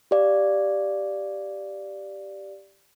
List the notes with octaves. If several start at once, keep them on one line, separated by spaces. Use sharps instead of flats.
G4 D5 F5